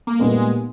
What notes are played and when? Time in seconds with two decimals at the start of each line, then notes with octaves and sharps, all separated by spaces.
0.07 A#3
0.19 A#2 G3 G#3 B3 D#4 A#4